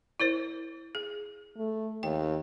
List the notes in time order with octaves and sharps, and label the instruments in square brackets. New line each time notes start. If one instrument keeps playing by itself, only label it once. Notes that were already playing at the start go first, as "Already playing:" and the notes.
[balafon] E4 A#4 C5
G#4
[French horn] A3
[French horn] D#2 [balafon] G5